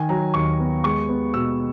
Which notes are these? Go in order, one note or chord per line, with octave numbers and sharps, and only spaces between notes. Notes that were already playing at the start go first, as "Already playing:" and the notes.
Already playing: D#3 G#5
F#3 A#5
D#2 C#6
B3
G#3 C#6
B3
B2 E6